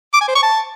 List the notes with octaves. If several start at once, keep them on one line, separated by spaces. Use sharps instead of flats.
D6
G#5
C5
C#6
A5